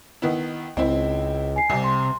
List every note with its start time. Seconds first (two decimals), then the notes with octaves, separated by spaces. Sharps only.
0.22 D#3 B3 E4
0.77 C#2 C4 E4 D#5
1.56 G#5 C7
1.69 C2 C3
1.84 C6